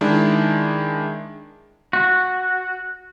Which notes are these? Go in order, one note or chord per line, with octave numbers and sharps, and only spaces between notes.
D#3 G#3 D4 E4
F#4